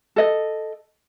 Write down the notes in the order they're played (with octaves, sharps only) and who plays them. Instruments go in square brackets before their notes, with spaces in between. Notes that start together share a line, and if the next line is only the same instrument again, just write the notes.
[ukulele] A4 D#5